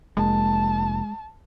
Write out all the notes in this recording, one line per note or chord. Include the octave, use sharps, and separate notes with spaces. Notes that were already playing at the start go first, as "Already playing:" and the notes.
F1 G#3 A#3 A5